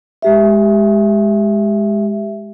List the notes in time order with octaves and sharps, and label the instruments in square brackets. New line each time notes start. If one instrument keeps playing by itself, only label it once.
[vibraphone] G#3 G4 E5